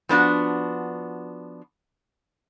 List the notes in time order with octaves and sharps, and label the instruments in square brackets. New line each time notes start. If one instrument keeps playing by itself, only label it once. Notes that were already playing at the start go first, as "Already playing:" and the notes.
[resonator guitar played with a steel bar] F3 B3 D4 F#4